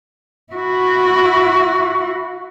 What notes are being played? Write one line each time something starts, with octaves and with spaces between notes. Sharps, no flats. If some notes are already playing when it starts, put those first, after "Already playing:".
E4 F#4